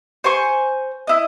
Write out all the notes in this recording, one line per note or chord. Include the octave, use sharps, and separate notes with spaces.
C5 G#5 C#6
E4 D#5